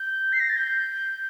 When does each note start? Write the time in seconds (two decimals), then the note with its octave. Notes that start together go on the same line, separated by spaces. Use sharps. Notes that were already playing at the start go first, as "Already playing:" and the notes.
Already playing: G6
0.33 C7
0.40 A#6
0.49 A6
0.57 G6